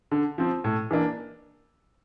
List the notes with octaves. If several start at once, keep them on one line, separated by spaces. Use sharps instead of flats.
D3
F3 C4
A2
E3 A#3 D4